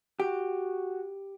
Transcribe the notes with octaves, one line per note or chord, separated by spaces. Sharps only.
F#4 G4